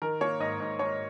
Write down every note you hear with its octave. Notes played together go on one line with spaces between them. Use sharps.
D#3 A#4
A#3 C#5
G#2 D#5
G#2
G#2 C#5